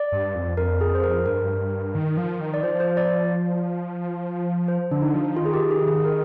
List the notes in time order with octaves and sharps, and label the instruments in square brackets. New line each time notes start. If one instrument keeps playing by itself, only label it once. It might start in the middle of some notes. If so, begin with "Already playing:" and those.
Already playing: [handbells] D5
[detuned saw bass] G2
F2
[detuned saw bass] F2 [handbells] A#4
[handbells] G#4
C5
A#4
[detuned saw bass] G2 [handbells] A#4
[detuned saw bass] D#3
F3
D#3
[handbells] D5
[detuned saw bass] F3 [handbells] C5
[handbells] C5
D5
C5
[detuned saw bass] D3 [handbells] D4
[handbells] D#4
[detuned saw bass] F3
[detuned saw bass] D#3 [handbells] F4
[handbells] G#4
G4
G#4
G#4
A#4